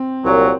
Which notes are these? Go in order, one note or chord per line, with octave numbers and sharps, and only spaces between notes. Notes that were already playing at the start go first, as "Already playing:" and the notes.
Already playing: C4
C2 A#2 F#3